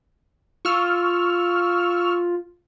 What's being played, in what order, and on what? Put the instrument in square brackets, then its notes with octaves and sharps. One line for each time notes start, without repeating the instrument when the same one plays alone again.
[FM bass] F4 [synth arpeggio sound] C#6 E6 F6